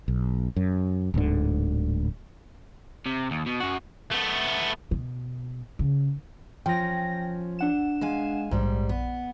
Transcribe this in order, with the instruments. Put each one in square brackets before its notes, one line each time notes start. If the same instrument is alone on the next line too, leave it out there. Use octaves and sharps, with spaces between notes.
[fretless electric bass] B1
F#2
D1 D2 G#2 D3
[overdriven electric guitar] C3
D#2
B2
F#2 F#4
[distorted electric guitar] A3 B3
[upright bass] B2
C#3
[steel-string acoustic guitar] F3 C#4 [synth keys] G5 A#6
[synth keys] D4 F#5 E7
[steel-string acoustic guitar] G#3 F5 G#5
[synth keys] A#1 [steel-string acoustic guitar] G#2 G3
[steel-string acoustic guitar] B3